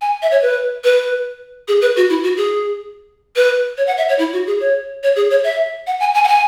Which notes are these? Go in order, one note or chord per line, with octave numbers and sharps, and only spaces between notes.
G#5
E5
C#5
B4
B4
G#4
B4
F#4
E4
F#4
G#4
B4
C#5
F#5
E5
C#5
E4
F#4
G#4
C#5
C#5
G#4
C#5
E5
F#5
G#5
G#5
F#5
G#5